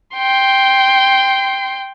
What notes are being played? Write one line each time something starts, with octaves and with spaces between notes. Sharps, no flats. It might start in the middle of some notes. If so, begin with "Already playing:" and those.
G5 C6